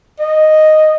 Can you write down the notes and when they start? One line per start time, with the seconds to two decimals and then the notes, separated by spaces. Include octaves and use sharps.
0.19 D#5